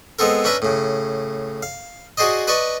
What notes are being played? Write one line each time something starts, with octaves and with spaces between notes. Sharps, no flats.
G#3 B3 C4 A4 A#4
C#4 D4 B4 E5 A#5
A2 C#3
F5
F#4 G#4 C5 D5 D#5
B4 D5 D#5 A5 C#6